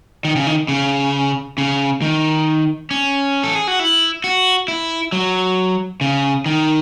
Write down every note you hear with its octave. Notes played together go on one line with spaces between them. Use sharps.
D#3
C#3
D#3
C#3
C#3
D#3
C#4
A4
G#4
F#4
E4
F#4
E4
F#3
C#3
D#3